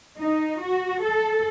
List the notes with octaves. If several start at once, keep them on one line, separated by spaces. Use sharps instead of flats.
D#4
F#4
A4